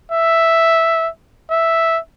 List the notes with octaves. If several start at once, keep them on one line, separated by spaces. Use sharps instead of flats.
E5
E5